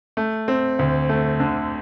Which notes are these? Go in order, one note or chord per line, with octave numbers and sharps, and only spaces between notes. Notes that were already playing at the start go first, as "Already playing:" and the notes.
A3
C4
D2
A3
D3